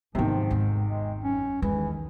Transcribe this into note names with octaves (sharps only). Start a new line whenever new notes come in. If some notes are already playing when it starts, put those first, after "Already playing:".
G#2 C3 D#3 F3 F#3 B3
G#1 E2
G#3
F#2 C#4
B1 E2 D#3 E3 G#3